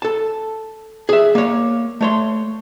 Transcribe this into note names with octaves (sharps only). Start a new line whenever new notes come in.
A4 A5
G#4 E5
A#3 C#5
A3 C#5 C6